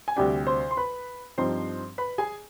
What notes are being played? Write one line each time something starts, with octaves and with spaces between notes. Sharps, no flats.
G#5
D2 C3 G3 D4 G4 G5
C5 C6
C6
B4 B5
G2 F3 C4 D#4 C5 C6
B4 B5
G#4 G#5